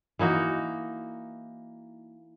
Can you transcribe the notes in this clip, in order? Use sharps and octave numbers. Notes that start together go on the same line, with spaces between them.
E3 A#3 D#4 F#4